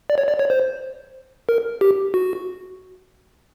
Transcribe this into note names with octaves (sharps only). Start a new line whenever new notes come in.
D5
C#5
D5
C#5
C5
A#4
G4
F#4